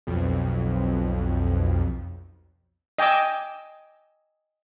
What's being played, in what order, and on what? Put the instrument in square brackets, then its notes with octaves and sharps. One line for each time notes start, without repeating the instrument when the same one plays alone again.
[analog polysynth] B1 F2
[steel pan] D#5 G5 G#5 D6 E6